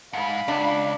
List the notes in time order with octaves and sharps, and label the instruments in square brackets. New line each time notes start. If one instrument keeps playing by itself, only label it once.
[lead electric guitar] G#2 [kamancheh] F5 B5
[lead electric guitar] C#2 [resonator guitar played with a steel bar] D4